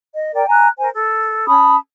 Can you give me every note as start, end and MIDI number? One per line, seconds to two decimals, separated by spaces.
0.14 0.32 75
0.33 0.45 70
0.33 0.45 74
0.33 0.45 79
0.49 0.68 80
0.49 0.68 82
0.49 0.68 90
0.78 0.88 70
0.78 0.88 72
0.78 0.88 80
0.93 1.47 69
1.47 1.75 61
1.47 1.75 81
1.47 1.75 83
1.47 1.75 87